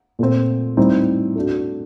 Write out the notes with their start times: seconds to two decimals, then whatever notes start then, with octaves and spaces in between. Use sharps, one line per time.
0.19 A#2 A3 C4
0.77 A2 G3 C4 D#4
1.36 A3 D4 F#4